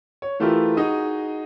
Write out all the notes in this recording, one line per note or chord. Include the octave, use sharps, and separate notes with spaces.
C#5
E3 A3 E4 F4 G4 A#4
D#4 F#4 G#4 D#5